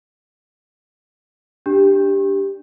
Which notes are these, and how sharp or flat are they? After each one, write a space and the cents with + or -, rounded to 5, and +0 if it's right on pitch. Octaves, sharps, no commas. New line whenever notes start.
D4 +0 G4 +0